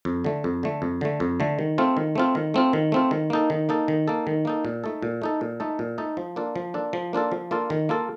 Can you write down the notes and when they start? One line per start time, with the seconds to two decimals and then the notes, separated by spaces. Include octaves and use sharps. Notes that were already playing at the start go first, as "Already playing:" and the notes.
0.05 F2
0.24 D3 A3
0.44 F2
0.63 D3 A3
0.82 F2
1.01 D3 A3
1.20 F2
1.40 D3 A3
1.59 D#3
1.78 A3 C4 F4
1.97 D#3
2.15 A3 C4 F4
2.35 D#3
2.54 A3 C4 F4
2.73 D#3
2.92 A3 C4 F4
3.11 D#3
3.30 A#3 D#4 A4
3.50 D#3
3.69 A#3 D#4 A4
3.88 D#3
4.08 A#3 D#4 A4
4.27 D#3
4.45 A#3 D#4 A4
4.65 A#2
4.84 A3 D#4 A4
5.02 A#2
5.22 A3 D#4 A4
5.41 A#2
5.60 A3 D#4 A4
5.79 A#2
5.98 A3 D#4 A4
6.17 F3
6.36 A#3 D4 F4 A4
6.56 F3
6.74 A#3 D4 F4 A4
6.93 F3
7.13 A#3 D4 F4 A4
7.32 F3
7.51 A#3 D4 F4 A4
7.70 D#3
7.89 A#3 F4 A4